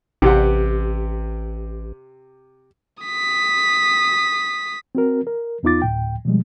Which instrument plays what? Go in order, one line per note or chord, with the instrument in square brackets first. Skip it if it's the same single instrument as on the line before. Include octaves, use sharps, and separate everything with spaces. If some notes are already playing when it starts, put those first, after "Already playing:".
[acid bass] A1 [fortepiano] C3 G4 F#5
[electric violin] D#6 B6
[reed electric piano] C4 F#4 A#4
A#4
E2 B3 D#4 F4 D6 A6
D2 A2 G5
B2 F3 G3 G#3